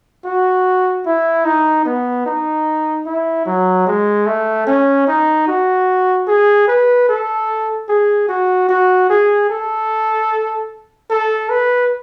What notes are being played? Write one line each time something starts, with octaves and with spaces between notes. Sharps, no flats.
F#4
E4
D#4
B3
D#4
E4
F#3
G#3
A3
C#4
D#4
F#4
G#4
B4
A4
G#4
F#4
F#4
G#4
A4
A4
B4